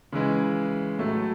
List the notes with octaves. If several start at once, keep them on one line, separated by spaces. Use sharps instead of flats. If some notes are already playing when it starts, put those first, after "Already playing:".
C#3 E3 G#3
A2 F#3 A3